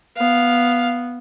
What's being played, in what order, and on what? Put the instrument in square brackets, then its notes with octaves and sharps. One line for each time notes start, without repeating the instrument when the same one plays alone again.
[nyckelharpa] B3 [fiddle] F5